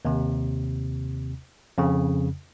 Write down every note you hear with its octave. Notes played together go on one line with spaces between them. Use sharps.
D#2 C3
F2 C#3